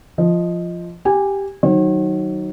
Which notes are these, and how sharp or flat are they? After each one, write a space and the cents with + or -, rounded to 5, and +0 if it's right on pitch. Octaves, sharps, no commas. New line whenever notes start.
F3 -5 D#5 +0
G4 +0 G#5 -20
D#3 +0 F#3 +20 C#5 -45